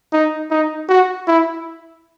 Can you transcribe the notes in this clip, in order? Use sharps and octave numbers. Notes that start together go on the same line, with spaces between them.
D#4
D#4
F#4
E4